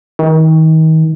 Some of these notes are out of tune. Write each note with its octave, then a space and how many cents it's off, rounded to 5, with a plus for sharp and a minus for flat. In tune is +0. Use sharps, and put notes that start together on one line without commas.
D#3 +35